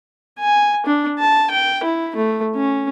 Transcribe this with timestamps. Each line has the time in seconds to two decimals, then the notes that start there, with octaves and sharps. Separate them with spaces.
0.40 G#5
0.86 D4
1.19 A5
1.50 G5
1.83 E4
2.16 A3
2.55 C#4